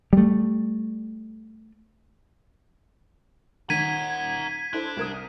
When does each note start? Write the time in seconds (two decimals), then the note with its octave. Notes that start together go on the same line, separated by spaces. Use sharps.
0.13 G3 A3
3.70 D#3 A#4 F#5 G#6 B6 D#7
4.73 D4 E4 A4 C5
4.97 C2 A#4 D#6